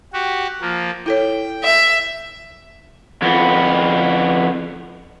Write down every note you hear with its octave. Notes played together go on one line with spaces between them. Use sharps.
F#4 G4
F3 A#3
E4 A4 C#5 G5
E5
F2 B3